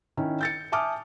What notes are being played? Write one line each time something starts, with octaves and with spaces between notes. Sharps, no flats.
D#3 C#4 E4
G6 A6 C#7
E5 G#5 A5 D6 D#6 F6